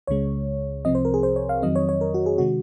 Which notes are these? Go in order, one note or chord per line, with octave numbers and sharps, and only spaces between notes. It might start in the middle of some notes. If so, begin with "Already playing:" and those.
C#2 C#3 G#3 C#5
C2 C3 F3 C4 D#5
C5
A#4
G#4
C5
C#5
F5
F2 D#3 F#3 C4 D#5
C#5
C#5
A#4
F#4
G#4
C3 D#3 G#3 F#4